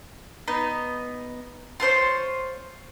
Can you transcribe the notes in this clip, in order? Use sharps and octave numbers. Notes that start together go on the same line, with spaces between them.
B3 D#4
F4 A4 C5 C#5